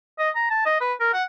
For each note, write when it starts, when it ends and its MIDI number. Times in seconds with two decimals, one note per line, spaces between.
0.19 0.30 75
0.36 0.46 82
0.50 0.63 81
0.66 0.77 75
0.81 0.93 71
1.00 1.09 70
1.13 1.23 78